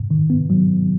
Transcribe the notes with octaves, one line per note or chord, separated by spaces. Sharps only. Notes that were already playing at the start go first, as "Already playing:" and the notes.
Already playing: G#2
D#3
B3
F#3